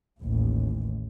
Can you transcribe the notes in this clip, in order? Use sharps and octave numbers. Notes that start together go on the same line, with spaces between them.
A1 D#2